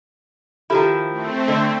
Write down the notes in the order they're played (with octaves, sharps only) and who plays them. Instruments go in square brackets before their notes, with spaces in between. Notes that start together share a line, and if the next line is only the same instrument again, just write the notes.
[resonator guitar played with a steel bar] D#3 F3 E4 [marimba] G4 A4 B5
[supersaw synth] A3 C4
[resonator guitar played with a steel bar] D3 [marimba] D#5 E6